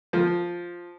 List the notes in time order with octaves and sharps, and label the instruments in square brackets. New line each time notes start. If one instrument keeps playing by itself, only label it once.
[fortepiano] F3